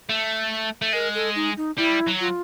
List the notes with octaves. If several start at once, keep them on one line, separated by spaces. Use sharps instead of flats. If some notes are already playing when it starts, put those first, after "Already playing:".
A3
A3
G#3 A#4
A4
D#4
D#4
G3 E4
F#3
F4